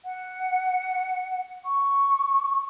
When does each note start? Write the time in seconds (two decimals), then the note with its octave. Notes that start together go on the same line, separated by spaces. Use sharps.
0.05 F#5
1.65 C#6